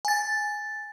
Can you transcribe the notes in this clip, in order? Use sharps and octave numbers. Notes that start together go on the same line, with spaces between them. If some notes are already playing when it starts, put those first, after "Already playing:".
G#5 A6